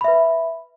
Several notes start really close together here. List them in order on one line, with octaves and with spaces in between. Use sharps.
B5 E5 B4